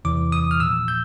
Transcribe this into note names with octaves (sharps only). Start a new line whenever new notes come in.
E2 C3 E3 D6
D#6
F6
A#2 F3 E6
G6